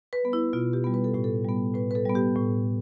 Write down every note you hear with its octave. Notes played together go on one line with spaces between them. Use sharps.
B4
G3 B3
E4
B2 F4
G4
G3 B3
B4
A4
A2 G4
A4
G3 B3
A2 B4
B4
A4
G3 B3
G4
A2